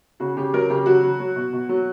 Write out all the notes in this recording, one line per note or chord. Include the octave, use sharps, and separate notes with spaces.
C#3 F#4
C#3 G4
F#3 A#4
C#3 G4
F#3 F#4
F#3
F#3
B2
B2
F#3